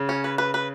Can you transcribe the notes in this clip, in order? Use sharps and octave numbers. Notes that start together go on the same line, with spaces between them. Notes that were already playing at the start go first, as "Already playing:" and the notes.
Already playing: C#3
C#4
B4
B4
B4